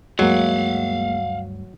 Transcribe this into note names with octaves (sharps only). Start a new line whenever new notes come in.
D2 G2 F#3 G#3 A#3 F5 F#5